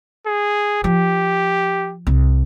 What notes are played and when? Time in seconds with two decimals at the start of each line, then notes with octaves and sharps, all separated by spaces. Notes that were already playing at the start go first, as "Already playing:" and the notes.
0.27 G#4
0.84 F3 G4
2.07 C2